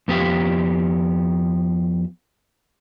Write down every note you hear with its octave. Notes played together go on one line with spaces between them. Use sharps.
F2 B3 G4 E5 F5